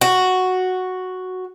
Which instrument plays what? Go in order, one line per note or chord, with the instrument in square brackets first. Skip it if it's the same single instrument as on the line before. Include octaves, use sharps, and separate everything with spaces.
[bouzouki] F#4